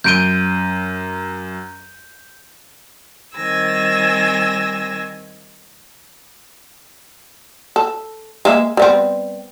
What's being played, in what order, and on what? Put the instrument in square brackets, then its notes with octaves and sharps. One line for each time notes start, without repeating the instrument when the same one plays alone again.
[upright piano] F#2 D7 G7 [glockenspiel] G6 D#7
[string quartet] D#3 G3 C4 G#5 E6 A#6
[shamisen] A4
G#3 A#3 E5
G3 B3 C4